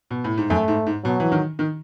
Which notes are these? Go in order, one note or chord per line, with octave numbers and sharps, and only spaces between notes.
B2
A2
G#2
F#2 A3
G#2
G#2
B2 F#3
E3
D#3
D#3